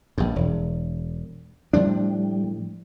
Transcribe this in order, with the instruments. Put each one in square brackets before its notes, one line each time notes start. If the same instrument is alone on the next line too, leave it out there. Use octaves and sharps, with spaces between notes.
[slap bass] A#1 G2
E1
[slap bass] A2 F3 D4 [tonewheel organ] G3